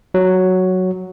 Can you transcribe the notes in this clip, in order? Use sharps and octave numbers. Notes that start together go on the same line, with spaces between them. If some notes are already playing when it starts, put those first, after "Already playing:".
F#3